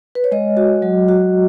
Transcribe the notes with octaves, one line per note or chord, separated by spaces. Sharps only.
B4
C#5
G#3 D#5
F#4
F#3
F#4